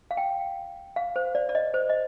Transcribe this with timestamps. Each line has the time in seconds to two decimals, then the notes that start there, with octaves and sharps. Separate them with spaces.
0.11 F5
0.17 G5
0.96 F5
1.16 C5
1.35 D5
1.49 D5
1.55 D#5
1.74 C5
1.89 D#5